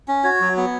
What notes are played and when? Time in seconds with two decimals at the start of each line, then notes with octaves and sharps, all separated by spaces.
0.08 C#4
0.24 F#4 C#5
0.40 F#3
0.57 B3